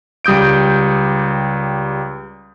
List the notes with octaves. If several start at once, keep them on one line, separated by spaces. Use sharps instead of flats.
C#2 G3 D#6 G6 D7